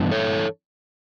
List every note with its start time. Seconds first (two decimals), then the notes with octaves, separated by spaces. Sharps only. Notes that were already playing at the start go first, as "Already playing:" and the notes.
Already playing: G2 E3 B3 D4
0.11 A4 C#5